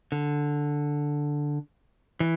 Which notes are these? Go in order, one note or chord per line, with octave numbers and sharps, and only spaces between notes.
D3
E3